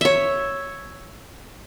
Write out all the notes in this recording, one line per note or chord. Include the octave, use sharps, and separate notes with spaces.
C#5 E5